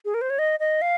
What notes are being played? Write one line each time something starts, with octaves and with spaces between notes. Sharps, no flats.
G#4
A#4
C5
C#5
D#5
D#5
F5